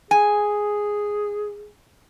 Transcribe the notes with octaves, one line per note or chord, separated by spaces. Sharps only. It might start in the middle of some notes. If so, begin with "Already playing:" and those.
G#4 G#5